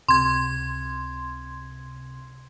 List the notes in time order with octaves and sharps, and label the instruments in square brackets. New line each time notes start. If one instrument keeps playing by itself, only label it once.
[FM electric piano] C#2 C3 [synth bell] C6 G#6